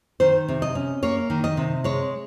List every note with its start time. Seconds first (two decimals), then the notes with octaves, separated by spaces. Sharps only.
0.20 D#3 C5
0.48 C3
0.62 D#5
0.75 C#4
1.03 A#3 C#5
1.30 D#3
1.44 D#5
1.57 C3
1.84 G#3 C#5